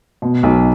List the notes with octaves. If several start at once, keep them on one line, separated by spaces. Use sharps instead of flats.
B2
B1